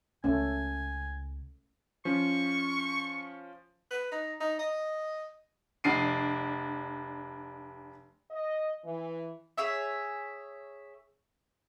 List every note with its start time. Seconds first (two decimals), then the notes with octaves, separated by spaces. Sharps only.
0.24 C#2 A3 C#4 G#5
2.05 F3 C#4 C#6
3.90 B4
4.11 D#4
4.40 D#4
4.59 D#5
5.84 F1 D4 C7 D7 D#7
8.31 D#5
8.84 E3
9.58 G#4 C#5 E5